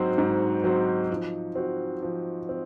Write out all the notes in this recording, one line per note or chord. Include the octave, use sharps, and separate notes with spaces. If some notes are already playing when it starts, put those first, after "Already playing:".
Already playing: G#2 F#3 C4 F#4 C5
G#2
F#3 C4 F#4 C5
F3
C4 F#4
F3
C4